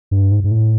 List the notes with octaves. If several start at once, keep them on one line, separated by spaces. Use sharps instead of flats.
G2
G#2
G#2
A2